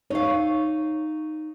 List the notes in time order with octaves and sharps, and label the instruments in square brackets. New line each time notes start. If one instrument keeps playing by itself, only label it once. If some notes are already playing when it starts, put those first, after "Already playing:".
[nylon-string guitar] D#4 F5 [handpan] C#5